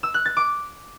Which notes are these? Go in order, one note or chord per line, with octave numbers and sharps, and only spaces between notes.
E6
F#6
A6
D6